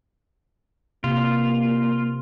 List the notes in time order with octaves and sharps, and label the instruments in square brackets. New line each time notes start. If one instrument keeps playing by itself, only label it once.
[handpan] C3 [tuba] A#3 [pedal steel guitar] F4